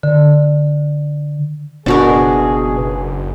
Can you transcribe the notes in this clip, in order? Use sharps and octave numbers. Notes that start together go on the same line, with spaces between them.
D3
F#1 B2 D4 F#4 G#4 A#4